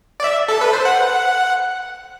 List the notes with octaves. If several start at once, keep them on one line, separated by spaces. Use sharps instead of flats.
D5
E5
A4
B4
C5
F#5